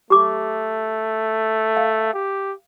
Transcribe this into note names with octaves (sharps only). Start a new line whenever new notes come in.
A3 G4 D6
F5
G4